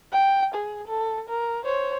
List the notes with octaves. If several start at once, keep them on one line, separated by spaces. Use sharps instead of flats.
G5
G#4
A4
A#4
C5 C#5